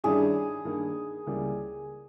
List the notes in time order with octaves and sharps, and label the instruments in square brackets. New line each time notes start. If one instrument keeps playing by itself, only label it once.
[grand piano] G2 D#3 G3 C#4 E4 [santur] G#4
[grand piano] G2 D#3 A#3
C#2 C#3 G3 A#3 E4